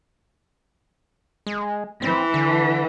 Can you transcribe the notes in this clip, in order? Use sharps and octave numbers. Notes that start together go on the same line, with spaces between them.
G#3
E3 C4
D3